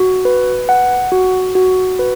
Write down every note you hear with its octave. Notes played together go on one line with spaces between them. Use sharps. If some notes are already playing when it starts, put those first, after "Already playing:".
Already playing: F#4
B4
F#5
F#4
F#4
B4